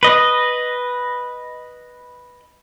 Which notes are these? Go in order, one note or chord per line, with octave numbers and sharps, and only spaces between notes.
B4 D#5